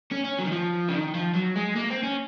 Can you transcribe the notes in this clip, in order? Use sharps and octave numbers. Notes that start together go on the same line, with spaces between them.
C#4
C#4
F#3
D#3
F3
C#3
D#3
F3
F#3
G#3
A#3
C4
C#4